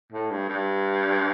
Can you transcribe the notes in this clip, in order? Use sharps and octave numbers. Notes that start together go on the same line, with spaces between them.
A2
G2
G2